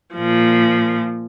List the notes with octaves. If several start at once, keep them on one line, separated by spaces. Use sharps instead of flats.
A#2 F3